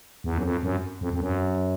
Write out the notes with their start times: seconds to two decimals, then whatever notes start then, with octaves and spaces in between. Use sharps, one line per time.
0.24 E2
0.38 F#2
0.43 F2
0.63 F#2
1.01 F2
1.13 F2
1.21 F#2